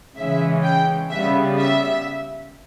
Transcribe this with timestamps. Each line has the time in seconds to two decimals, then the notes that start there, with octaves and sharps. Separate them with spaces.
0.16 C#3 E3 G#3 C#4 E5
0.63 G5
1.10 C#3 G3 B3 E5
1.57 E5